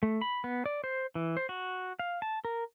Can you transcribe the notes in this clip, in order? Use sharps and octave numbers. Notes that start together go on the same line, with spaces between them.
A3
B5
B3
D5
C5
E3
C5
F#4
F5
A5
A#4